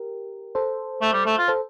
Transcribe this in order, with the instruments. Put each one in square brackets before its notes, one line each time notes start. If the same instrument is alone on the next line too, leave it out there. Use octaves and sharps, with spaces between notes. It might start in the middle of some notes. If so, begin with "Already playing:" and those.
Already playing: [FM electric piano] G4 A#4
A4 C5
[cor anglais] A3
G3
A3
F4
[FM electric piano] A4 C5